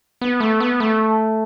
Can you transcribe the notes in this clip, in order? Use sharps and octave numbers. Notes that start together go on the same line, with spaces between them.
B3
A3
B3
A3